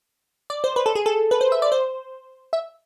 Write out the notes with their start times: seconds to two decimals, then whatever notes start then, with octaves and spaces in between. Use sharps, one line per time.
0.50 D5
0.64 C5
0.76 B4
0.86 A4
0.95 G#4
1.06 A4
1.31 B4
1.41 C5
1.52 E5
1.62 D5
1.72 C5
2.53 E5